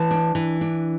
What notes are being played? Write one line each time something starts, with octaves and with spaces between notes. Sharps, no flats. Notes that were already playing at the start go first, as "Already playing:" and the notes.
Already playing: E3 A5
D4
E3
D4